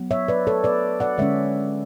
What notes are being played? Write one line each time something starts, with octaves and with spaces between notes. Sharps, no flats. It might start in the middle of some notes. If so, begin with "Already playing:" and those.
Already playing: F#3 B3
C#5 E5
B4 D5
A4 C#5
B4 D5
D5 F#5
D3 G#3 C#4 C#5 E5